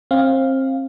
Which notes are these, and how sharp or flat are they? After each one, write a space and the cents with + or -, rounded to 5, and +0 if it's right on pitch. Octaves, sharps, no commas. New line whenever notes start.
C4 +30 F5 +0